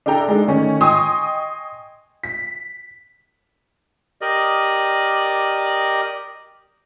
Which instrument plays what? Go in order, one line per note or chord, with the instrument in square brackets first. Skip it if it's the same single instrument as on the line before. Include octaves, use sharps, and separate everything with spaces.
[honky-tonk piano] D4 E4 A4 G5 A#5
G#3 D4 D#4 A4
D#3 A3 C#4 C#5
D#5 G5 G#5 C6 C#6 D#6
B6
[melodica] G4 A#4 D5 D#5